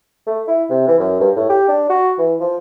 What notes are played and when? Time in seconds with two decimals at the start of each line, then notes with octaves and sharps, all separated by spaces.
0.26 A3
0.47 E4
0.70 C3
0.87 E3
0.99 F#2
1.20 G2
1.36 A2
1.49 G4
1.68 D4
1.89 F#4
2.18 E3
2.40 F3